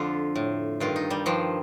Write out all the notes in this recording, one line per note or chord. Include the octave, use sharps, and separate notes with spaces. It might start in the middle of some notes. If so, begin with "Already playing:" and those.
Already playing: F2 D3 F4
A2
G2 D#3 F4
D#4
G3
G2 D#3 F3